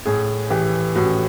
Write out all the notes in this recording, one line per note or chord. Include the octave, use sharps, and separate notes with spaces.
A2 G#4
E3 G4
A2 F#4